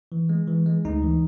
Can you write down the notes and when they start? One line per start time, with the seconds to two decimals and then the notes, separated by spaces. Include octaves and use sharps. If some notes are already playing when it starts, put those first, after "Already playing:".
0.12 E3
0.29 G#3
0.48 E3
0.66 G#3
0.85 D2 D#4
1.03 E3